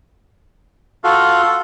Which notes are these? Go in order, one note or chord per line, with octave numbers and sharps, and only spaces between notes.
F4 F#4 A4 F5